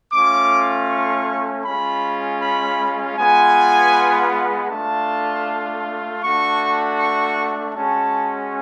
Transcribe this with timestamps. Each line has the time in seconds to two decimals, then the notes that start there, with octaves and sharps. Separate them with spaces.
0.12 A3 C#4 F4 D6
0.89 C#6
1.65 G#3 C#4 F4 B5
2.42 B5
3.18 G#3 B3 F4 G#5
4.70 A3 D4 F4 A5
6.23 A3 D4 F#4 C#6
6.99 C#6
7.75 G#3 C#4 F#4 A5